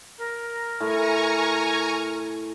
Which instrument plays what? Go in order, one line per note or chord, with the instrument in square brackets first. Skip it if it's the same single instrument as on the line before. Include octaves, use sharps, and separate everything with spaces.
[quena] A#4
[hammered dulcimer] A2 [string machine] G#5 A#5 C#6